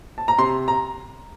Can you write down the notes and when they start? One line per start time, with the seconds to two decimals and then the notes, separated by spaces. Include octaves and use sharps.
0.18 A5
0.28 A#5
0.38 C3 C6
0.68 A#5